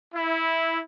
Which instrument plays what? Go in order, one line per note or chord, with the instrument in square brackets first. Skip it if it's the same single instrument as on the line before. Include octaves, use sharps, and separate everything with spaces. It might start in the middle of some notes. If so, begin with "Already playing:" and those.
[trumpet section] E4